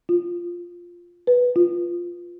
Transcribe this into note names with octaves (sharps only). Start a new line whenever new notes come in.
F4
B4
F4